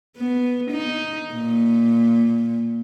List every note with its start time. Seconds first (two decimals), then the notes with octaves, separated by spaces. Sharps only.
0.17 B3
0.71 D#4
1.34 A#2